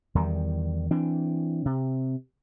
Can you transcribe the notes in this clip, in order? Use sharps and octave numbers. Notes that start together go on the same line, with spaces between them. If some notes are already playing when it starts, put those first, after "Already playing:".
E2 D#3 G3
E3 C4 D4
C3